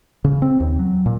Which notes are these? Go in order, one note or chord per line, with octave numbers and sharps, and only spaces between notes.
C#3
C4
D#2
F#3
A#2